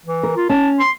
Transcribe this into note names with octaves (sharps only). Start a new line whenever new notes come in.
E3
A#4
F4
C#4 A5
C6